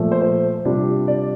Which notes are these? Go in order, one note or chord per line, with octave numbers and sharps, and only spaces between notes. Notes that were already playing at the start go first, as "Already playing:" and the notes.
Already playing: A#2 F3 A3
C5
C5
C3 G3 D4 F4
D5